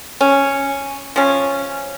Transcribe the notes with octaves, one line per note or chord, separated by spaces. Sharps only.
C#4
F3 C#4